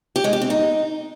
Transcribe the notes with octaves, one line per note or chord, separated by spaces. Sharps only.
G4
G#3
G4
C4
D#4